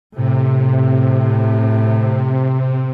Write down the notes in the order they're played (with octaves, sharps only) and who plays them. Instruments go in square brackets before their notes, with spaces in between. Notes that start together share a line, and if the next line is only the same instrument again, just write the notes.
[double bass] A2 [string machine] C3